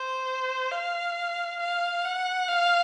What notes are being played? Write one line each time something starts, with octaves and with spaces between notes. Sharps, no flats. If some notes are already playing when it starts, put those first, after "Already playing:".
Already playing: C5
F5
F5
F#5
F5